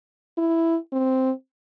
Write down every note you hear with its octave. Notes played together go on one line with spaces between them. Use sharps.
E4
C4